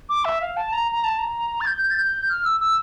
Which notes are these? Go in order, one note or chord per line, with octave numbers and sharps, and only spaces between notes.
D6
E5
F5
A5
A#5
A#5
A5
A#5
A6
G6
G6
A6
G6
F6
E6
E6